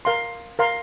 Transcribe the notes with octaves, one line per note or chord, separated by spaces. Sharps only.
A#4 F5 C6
A#4 F5 C6